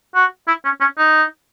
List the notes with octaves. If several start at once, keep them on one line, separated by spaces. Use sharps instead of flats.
F#4
E4
C#4
C#4
D#4